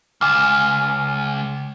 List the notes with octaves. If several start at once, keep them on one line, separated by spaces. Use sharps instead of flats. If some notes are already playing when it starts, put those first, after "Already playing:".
C#2 G#5 D6 F6